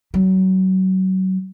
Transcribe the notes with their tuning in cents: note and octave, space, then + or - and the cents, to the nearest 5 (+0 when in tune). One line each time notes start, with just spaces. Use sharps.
F#3 +25